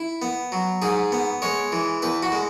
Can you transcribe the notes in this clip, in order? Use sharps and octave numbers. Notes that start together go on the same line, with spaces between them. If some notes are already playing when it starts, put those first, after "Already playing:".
Already playing: E4
B3
F#3
G#2 G#4
B3
G#3 C#5
E3
E2 B4
F#4
G#3